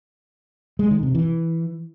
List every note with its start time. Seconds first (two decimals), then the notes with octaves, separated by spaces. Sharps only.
0.79 G#3
0.91 D#3
1.03 C3
1.15 E3